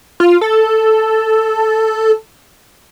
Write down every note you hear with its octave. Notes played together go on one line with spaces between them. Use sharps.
F4
A4